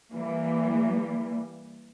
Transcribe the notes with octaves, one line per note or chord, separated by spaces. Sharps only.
E3 G3 A#3